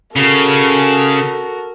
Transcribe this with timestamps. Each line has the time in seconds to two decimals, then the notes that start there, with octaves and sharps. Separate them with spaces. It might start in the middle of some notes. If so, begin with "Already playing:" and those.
0.16 C#3 F#4 A4 A#4